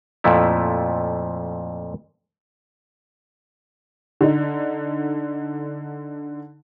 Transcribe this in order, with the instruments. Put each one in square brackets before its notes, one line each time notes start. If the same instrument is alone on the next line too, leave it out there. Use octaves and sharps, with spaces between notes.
[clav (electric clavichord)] F2 A#2 F3 A3 E4
[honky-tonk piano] D3 D#4